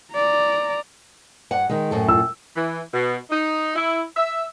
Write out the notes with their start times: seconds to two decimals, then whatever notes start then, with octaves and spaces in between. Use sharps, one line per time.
0.13 D5 A#5
1.51 G2 F#5
1.69 D#3 G#3
1.91 F#2 A2 A4
2.09 E6
2.55 E3
2.94 B2
3.30 D#4
3.76 E4
4.16 E5